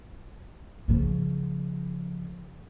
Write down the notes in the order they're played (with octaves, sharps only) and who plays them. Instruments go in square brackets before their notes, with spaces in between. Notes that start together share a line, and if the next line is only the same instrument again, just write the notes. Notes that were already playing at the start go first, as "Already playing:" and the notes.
[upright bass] C#3 F3